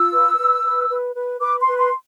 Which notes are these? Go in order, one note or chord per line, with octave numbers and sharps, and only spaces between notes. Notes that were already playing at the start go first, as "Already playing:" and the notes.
Already playing: F4 E6
B4
B4
B4
B4
B4
B4 D6
C6
B4
C6